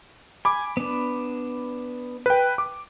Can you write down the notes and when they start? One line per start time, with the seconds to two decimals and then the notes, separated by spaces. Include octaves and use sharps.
0.45 G#5 B5 D6
0.77 B3 D4
2.26 B4 G5
2.58 D6